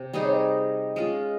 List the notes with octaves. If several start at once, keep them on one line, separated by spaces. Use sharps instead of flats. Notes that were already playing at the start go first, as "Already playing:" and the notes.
Already playing: C3
G3 C4 D#4 G#4 D#5
C#5
D#5
G#3 C#4 F4